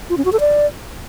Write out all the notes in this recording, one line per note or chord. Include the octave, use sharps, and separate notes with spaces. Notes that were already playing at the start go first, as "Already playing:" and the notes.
F4
C#4
F#4
A4
D5